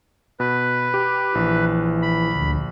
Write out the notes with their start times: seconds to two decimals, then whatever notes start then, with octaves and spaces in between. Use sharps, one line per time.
0.40 B2 B4
0.94 G4
1.35 A#1 E3
2.02 B5
2.33 D2